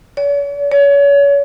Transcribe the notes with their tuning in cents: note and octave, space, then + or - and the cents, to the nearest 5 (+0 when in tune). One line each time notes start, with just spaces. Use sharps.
C#5 +45
C#5 +35